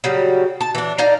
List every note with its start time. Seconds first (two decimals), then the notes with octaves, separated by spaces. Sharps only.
0.04 C#3 F#3 G3
0.61 A5
0.75 E3 D4
0.98 D#4 D5 F5 A#5